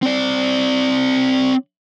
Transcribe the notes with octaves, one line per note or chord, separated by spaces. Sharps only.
C4 D5